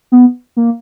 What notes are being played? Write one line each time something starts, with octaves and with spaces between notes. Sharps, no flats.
B3
A#3